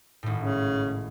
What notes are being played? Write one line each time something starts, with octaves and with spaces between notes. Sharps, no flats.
G#1 A2
C#3